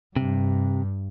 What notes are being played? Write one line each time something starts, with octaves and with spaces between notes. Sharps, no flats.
G2 C3